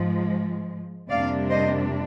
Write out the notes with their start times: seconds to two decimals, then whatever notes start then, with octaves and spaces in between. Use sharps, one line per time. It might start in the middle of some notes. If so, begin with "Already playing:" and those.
Already playing: G#2 F3 G#3
1.09 F2 C3 G3 A#3 D4 D5 F5
1.49 C5 D#5